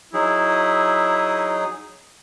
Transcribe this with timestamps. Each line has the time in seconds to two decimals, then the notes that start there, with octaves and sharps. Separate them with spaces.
0.14 F#3 D#4 E4 G#4